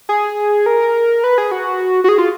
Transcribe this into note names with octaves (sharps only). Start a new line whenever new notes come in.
G#4
A#4
B4
G#4
F#4
F#4
G#4
F4